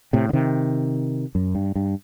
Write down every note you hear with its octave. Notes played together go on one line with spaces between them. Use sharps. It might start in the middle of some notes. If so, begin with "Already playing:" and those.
A2 C3
D3
C3 D#3
F#2
G2
G2